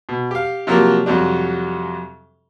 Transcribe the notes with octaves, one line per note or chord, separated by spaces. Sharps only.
B2
G4 F5
C3 F3 F#3 A#3 G4 A#4
F2 C3 F#3 G3 D4